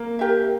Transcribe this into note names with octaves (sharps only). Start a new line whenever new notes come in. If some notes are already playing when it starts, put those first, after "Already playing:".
Already playing: A#3
G4 A#4 E5